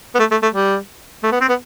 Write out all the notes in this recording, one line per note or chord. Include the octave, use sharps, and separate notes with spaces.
B3
A3
A3
A3
G3
A3
B3
C4
B3